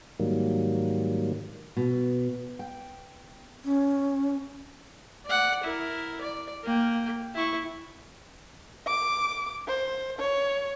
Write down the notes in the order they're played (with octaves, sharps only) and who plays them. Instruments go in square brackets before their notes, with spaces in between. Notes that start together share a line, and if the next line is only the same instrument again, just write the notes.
[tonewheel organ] G#2 D#3 F#3 G3 A#3
[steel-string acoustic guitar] B2
G5
[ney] C#4
[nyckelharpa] D5 F#5
E4 A#4
D5
A#3 G5
E4 C#6
[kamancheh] D6
C5
C#5